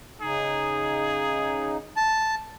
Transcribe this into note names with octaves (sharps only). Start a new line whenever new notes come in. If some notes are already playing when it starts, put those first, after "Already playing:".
C#3 D#4 G#4
A5